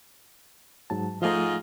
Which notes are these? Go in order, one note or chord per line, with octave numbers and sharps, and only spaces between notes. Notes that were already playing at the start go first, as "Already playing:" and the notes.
G#2 F#3 A5
G#2 F3 A3 F4 D#5